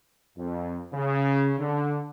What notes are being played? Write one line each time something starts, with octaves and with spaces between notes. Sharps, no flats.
F2
C#3
D3